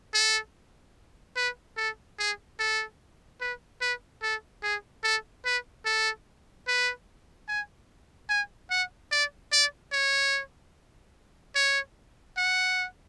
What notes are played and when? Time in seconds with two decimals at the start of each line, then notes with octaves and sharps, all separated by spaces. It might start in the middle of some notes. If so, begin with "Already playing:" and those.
0.14 A4
1.36 B4
1.77 A4
2.19 G#4
2.59 A4
3.41 B4
3.81 B4
4.23 A4
4.63 G#4
5.03 A4
5.45 B4
5.85 A4
6.67 B4
7.48 G#5
8.29 G#5
8.70 F#5
9.12 D5
9.53 D5
9.92 C#5
11.55 C#5
12.37 F#5